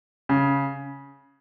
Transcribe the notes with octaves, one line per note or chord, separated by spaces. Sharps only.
C#3